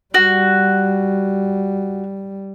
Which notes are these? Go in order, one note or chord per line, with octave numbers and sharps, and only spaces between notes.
G3 F#4